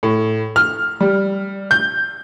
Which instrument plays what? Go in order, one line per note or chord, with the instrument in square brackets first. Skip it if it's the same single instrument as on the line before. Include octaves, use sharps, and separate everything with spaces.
[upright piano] A2
F6
G3
G6